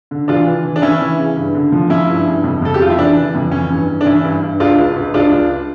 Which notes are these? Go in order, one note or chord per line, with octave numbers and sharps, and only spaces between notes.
D3
E3 D4 F4
E3
E3
D4
E3 C#4 E4
E3
C#3
G2
D3
F3
F3 C#4 E4
G2
G2
F2
F2 A4
G4
C#3 F4
E4
E3 D4
E3
F2
E3 C#4
G2
G2
D4
E3 C#4 E4
G2
G2
C#2 D4 F4
C#2
C#2
C#2 D4 F4
C#2